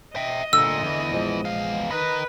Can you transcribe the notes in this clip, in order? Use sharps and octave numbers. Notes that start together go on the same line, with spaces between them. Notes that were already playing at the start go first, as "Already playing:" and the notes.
D#5 E5 G5
D2 A#2 D3 E6
E2 E3
A#1 F3 G#3
E2 F5
A#4 B4 D#5 B5